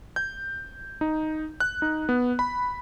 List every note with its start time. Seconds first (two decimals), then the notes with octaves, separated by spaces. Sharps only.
0.16 G6
1.01 D#4
1.60 F#6
1.82 D#4
2.09 B3
2.39 B5